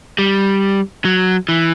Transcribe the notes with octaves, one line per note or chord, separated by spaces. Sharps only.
G3
F#3
E3